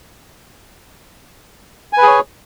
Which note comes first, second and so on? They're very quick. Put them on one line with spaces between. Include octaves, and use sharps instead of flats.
G#5 B4 G#4 C#5